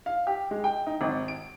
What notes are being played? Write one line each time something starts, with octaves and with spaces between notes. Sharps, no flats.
F5
G4
G#3
G5
D#4
G#1
D7